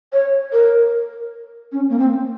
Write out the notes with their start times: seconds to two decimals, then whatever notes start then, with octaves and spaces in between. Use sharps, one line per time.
0.13 C#5
0.53 A#4
1.72 C#4
1.90 A#3
1.99 C4